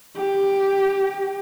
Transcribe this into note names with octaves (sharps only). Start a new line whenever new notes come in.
G4